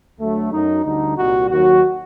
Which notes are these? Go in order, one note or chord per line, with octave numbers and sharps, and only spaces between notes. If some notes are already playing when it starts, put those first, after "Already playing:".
D2 D3 F#3 A3
F#2 F#3 D#4
D2 D3 G3 D#4
C2 A#2 G3 F#4
D#2 D#3 F#3 F#4